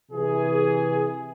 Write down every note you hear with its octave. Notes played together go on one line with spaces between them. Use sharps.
C3 E3 G#4